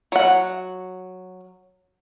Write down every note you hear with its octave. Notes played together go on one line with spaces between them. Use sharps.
F#3 F#5